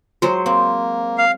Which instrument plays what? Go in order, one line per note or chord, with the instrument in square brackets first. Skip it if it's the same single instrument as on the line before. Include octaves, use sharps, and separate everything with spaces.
[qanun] F#3 C5 [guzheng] G#3
[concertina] A#3 [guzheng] C4
[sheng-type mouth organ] F5